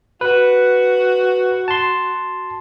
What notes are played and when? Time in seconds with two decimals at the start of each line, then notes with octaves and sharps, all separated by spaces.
0.21 F#4 B4
1.68 A5 C6